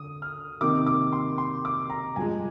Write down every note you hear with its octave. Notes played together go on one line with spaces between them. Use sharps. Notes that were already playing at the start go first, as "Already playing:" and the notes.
Already playing: D3 D#6
F6
C3 D#3 A#3 D#4 D6
D6
C6
C6
D6
A#5
G2 F3 G#3 G#5